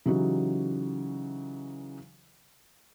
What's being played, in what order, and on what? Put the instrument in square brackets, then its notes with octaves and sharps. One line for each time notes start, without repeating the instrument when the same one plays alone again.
[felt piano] C#3 E3 F#3 D#4 F#4 G4